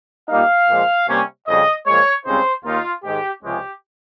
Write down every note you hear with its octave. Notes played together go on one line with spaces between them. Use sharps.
A#2 G3 A#3 D#4 F5
A#2 F3 G#3
C3 G3 A#3 C#4
F2 C#3 G3 D#5
A#2 F3 G#3 C#5
C#2 C#3 G3 C4 D#4 C5
D#2 D#3 A#3 D#4 F4
G#2 D#3 G#3 G4
C#2 C3 F3 G#3 C#4 G4